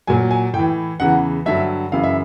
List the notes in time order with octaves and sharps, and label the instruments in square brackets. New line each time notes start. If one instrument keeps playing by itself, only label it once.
[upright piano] A#2 F#3 G#5
G#5
A2 G5
E3
E2 C#3 E3 F#5
G2 D3 F#3 E5
F#2 C#3 E3 F5
E5